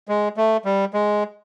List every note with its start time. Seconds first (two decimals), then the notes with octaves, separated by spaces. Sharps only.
0.09 G#3
0.37 A3
0.65 G3
0.94 G#3